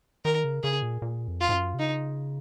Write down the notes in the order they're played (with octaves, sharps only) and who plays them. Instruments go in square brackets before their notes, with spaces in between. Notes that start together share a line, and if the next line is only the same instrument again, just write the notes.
[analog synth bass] D#3 [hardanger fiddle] A#4
[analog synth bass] C#3
[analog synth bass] C#3 [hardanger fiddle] G#4
[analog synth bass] A#2
A#2
F2
[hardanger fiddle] F4
[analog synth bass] G#2
F#2
C3
[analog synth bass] C#3 [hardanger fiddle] D#4